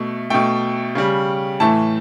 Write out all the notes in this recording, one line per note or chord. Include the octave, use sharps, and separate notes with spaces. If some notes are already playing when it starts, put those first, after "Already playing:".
Already playing: B2 A3
B2 A3 G5
C#3 G3
A2 E3 A3 A5